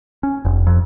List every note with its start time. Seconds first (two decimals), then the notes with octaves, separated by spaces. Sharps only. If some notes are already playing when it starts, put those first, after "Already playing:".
0.23 C#4
0.45 F1
0.67 F2